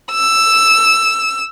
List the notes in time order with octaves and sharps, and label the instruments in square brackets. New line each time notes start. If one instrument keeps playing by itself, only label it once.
[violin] E6